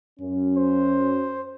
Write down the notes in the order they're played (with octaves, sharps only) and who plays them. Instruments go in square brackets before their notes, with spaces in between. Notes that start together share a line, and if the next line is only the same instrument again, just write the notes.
[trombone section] F#2 C#4
[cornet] C5